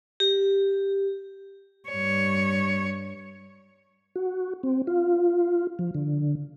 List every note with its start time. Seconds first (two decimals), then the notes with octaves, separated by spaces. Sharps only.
0.20 G4
1.89 G2 C#5
4.16 F#4
4.63 C4
4.87 F4
5.79 F3
5.95 D3